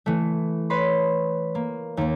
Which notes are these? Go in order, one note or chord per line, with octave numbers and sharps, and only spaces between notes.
E3 A3
B4 C#5 B5 C6
A#3
D#2 A#3